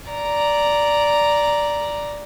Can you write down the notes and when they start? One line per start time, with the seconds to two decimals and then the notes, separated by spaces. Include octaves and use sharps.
0.11 D5 A#5